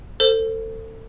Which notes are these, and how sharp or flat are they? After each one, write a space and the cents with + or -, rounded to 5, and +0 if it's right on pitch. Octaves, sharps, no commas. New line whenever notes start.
A4 +25 C5 +0